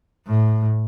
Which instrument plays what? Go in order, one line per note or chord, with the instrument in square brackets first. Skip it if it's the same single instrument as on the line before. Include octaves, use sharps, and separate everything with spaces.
[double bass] A2